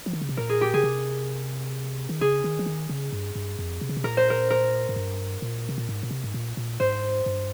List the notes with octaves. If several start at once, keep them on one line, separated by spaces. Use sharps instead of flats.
F3
D#3
C#3
C3
A#2 A#4
G#4
G4
C#3 G#4
C3
D#3
C#3 G#4
D#3
F3
D#3
C#3
G2
G2
F2
C3
C#3
C3
A#2 A#4
C5
A#4
A#4
G#2
G2
A#2
C3
A#2
G#2
A#2
C3
G#2
A#2
A#2
G#2 C5
G2